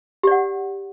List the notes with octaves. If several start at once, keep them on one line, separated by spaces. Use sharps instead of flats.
G4 D5 F#5